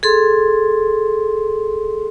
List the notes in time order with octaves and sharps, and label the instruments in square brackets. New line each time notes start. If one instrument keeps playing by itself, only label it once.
[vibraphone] G#4 A4 C6